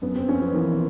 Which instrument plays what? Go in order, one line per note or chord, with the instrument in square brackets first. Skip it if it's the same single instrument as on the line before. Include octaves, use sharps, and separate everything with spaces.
[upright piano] F#2 [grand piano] B3
[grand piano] C4
[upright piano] F3 [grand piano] C#4
[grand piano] B3
[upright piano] E3 [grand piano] A#3